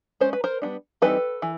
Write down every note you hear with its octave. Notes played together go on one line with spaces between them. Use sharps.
G#3 C#4 C5
B4
A#4 C5
G3 B3 D4
E3 G3 C4 D#4 A4 B4
E3